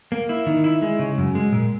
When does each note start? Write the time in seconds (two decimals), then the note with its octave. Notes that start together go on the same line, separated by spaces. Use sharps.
0.12 A#3
0.29 E4
0.46 D#3
0.64 E4
0.82 G#3
0.99 C#3
1.18 F#2
1.35 G#3
1.53 A#2